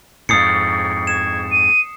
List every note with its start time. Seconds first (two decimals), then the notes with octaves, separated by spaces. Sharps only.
0.29 F2 G#2 D#6 C7 C#7
1.07 G#6 E7
1.52 D#7